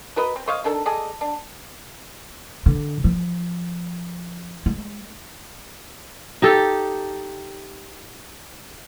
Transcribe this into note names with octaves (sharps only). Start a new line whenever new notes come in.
F#4 A#4 B4 D#5
C4
C5 C#5 D#5 F5
D#3 D4 A4 A#4
G#4 A4 D5 D#5
D4
D3
F3
G#3
D#4 G4 A4